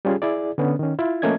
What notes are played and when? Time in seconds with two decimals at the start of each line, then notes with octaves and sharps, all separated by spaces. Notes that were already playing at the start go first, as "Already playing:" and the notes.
0.05 G3 C#4 F4 G#4
0.22 E4 G#4 D5
0.58 D3 B3 C#4
0.79 D#3 C#4
0.99 E4 F4
1.22 F3 A3 A#3 C#4 D#5 G#6